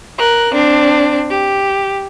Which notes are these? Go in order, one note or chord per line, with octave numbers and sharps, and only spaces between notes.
A#4 F#6
C4 D4
G4